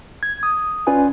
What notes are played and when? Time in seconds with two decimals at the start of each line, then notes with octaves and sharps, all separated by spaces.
0.23 G#6
0.43 D#6
0.87 C#4 F4 B4 D5 G#5